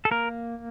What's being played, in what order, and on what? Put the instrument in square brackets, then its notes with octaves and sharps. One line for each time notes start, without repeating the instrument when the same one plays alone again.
[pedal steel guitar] A4
A#3 A#4